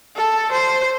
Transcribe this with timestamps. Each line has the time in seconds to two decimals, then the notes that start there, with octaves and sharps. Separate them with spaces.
0.16 A4
0.52 C5